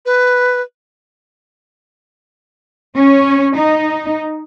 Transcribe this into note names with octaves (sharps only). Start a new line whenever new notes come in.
B4
C#4
D#4